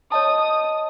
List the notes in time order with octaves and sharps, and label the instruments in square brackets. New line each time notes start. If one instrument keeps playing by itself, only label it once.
[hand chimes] C#5 D#5 A5 [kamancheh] D#6